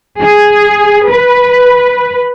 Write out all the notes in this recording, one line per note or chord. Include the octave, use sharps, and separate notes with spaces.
G#4
B4